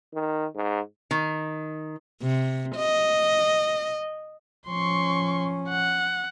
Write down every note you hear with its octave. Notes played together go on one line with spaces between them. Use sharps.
D#3
G#2
D#3
C3
D#5
F3 C#4 C6 C#6
F#5